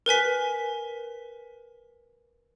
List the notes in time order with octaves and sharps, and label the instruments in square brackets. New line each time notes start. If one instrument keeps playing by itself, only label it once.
[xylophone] A#4 B4 G#5 B6